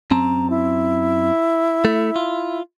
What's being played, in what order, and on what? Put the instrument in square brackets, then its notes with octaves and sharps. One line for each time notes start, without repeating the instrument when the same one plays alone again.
[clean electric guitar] F#2 C4 A5 [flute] A#5
[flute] E4
[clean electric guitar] A3
F4